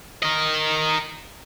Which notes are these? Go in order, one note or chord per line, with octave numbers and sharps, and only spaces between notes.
A#4 D#5